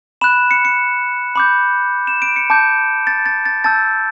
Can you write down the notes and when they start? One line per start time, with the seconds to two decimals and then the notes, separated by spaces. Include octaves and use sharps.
0.21 B5 F#6 E7
0.51 C#7
0.65 C#7
1.36 B5 D6 G6
2.07 E7
2.22 D7
2.36 C#7
2.50 A5 D6 G6
3.07 A6
3.26 A6
3.45 A6
3.64 A5 E6 G6 A6